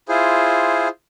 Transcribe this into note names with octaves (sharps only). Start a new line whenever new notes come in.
E4 F4 G#4 C5